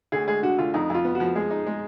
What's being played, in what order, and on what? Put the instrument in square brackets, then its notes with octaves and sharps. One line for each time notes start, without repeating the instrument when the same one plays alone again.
[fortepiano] D2 [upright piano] G#4
[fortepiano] G#3 [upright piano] G#4
[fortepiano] D3 [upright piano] F#4
[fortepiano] D2 [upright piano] F4
[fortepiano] F2 [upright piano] D#4
[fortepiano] F2 [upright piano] F4
[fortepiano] B3
[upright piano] F#4
[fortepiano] F3
[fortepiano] G#3 [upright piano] G#4
[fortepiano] D#4
G#3